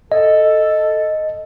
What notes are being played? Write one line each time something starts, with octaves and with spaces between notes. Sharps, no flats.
A4 D#5